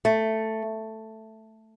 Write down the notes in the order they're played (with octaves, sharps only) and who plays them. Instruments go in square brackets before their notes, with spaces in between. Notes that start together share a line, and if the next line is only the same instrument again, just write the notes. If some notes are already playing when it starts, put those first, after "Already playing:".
[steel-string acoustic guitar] A3